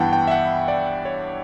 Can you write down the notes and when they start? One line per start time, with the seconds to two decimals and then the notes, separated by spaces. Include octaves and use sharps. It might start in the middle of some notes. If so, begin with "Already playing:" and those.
Already playing: G2 E3 B3 E4 F#5 G5 A5
0.13 G5
0.27 E5
0.31 F#5
0.68 D5
1.05 C#5